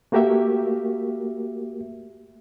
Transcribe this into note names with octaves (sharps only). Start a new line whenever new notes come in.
A3 A#3 F#4 G4 A#4 E5